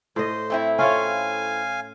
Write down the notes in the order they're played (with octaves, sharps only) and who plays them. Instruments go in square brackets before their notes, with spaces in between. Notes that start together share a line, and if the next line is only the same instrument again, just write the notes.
[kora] A2 D#5 [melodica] C5
[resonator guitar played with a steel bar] A3 C4 E4
[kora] C#4 F4 C#5 [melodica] F5 G#5